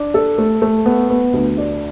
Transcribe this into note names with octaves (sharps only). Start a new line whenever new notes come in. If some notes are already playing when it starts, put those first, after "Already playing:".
Already playing: D4
A4
A3
A3
B3
B3
D2
D4